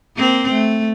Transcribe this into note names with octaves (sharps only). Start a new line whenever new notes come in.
A#3 C4
A3